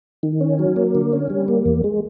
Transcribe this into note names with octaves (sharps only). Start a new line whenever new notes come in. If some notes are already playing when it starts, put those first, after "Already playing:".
D#3
C#4
F#3
A#3
D3
C#4
G3
A#3
E2
G#3